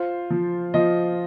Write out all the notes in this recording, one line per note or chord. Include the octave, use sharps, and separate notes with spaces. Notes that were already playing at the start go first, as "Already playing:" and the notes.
Already playing: F4 C5
F3
F3 D#5